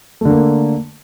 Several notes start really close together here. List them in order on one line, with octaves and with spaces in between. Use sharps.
A3 D3 A#3